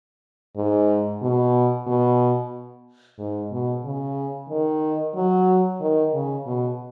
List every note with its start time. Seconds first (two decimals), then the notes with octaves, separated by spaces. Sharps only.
0.56 G#2
1.22 B2
1.87 B2
3.19 G#2
3.51 B2
3.84 C#3
4.49 D#3
5.15 F#3
5.80 D#3
6.14 C#3
6.46 B2